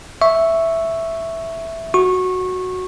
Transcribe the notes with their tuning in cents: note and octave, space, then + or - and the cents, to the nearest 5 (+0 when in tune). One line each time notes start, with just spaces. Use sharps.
E5 +0 C#6 +0
F#4 +0 C#6 -20